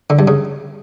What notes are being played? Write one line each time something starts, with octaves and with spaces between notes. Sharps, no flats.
D3
G2
C#3